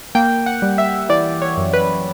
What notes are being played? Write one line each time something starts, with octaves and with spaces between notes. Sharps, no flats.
A#3 G5
F#5
G3
E5
E3 D5
C#5
F#2
B4